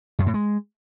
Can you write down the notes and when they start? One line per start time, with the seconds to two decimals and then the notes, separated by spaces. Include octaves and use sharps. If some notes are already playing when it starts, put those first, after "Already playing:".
0.19 F#2
0.26 A2
0.34 G#3